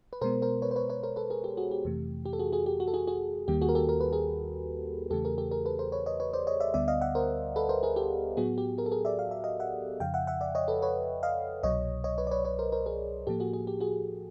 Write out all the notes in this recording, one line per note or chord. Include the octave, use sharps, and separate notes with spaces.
B4
B2 G#3 B3 A#4 C5
A#4 C5
B4 C#5
C5
B4 C#5
B4 C#5
A#4 C5
A4 B4
G#4 A#4
G4 A4
F#4 G#4
G4
F2 C3 E3 A3
G4
A4
F#4 G#4
F#4 G#4
G4
F#4
A4
F#4 G#4
F#4 G#4
D#2 D#3 G3 A#3 G4
F#4 G#4
A#4
G4 A4
A#4
B4
G#4 A#4
E2 C#3 E3 A3 G4 A4
G#4 A#4
G4 A4
G#4 A#4
A4 B4
A#4 C5
B4 C#5
C#5 D#5
B4 C#5
C5 D5
C#5 D#5
D5 E5
D2 D3 G3 B3 D5 E5
D#5 F5
E5 F#5
A#4 C5
A4 B4
A#4 C5
G#4 A#4
G4 A4
A2 F#3 B3 F#4 G#4
G4
G#4 A#4
A4
G#4 A#4
D5 E5
F5
E5
D#5 F5
E5 F#5
F2 C#3 F3 F5 G5
E5 F#5
E5 F#5
D5 E5
C#5 D#5
A4 B4
B4 C#5
D#5 F5
C2 B2 F#3 C#5 D#5
C#5 D#5
B4 C#5
D5
B4 C#5
B4 C#5
A#4 C5
A#4 C5
G#4 A#4
A2 F3 A#3 G4 A4
F#4 G#4
G#4
G4
F#4 G#4